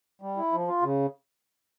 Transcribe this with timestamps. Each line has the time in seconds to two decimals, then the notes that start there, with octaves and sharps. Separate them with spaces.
0.21 G3
0.37 E4
0.52 F3
0.67 F4
0.82 C#3